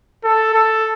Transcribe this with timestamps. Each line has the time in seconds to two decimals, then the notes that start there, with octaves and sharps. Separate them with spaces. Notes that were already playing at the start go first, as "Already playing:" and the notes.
0.24 A4
0.54 A4